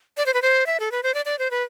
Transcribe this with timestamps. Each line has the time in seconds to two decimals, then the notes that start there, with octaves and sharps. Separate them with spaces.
0.17 D5
0.26 C5
0.34 B4
0.42 C5
0.66 E5
0.80 A4
0.92 B4
1.03 C5
1.14 D5
1.26 D5
1.39 C5
1.51 B4